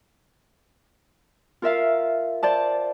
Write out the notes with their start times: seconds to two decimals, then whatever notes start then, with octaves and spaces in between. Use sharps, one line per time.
1.62 F4 A#4 E5 F5
2.43 C5 D5 A5